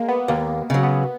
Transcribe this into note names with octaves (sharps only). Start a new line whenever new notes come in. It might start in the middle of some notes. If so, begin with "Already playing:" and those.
Already playing: G#3 A#3
B3
D#2 A#3
C#3 F#3
B3